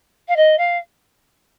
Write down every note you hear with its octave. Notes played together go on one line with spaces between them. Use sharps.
F5
D#5
F5